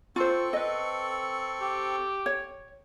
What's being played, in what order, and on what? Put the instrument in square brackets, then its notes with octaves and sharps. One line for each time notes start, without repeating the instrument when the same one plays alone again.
[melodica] C4 A4 C#6 [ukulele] F4 C5
[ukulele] B4 D#5
[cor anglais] G4
[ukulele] C#5